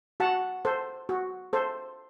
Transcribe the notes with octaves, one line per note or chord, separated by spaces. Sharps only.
F#4 F#5 A5
A4 C5
F#4
A4 C5